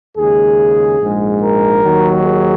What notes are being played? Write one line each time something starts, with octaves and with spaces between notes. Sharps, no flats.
D#2 C#3 G#3 G#4
A#1 G#2 G#3
A#4
D#2 D#3 F#3
G#4